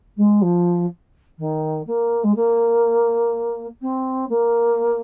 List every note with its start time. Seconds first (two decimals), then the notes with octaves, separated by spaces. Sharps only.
0.17 G#3
0.41 F3
1.38 D#3
1.86 A#3
2.23 G#3
2.35 A#3
3.81 C4
4.29 A#3